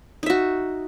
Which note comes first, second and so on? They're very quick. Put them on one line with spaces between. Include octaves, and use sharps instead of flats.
D#4 E5 F#4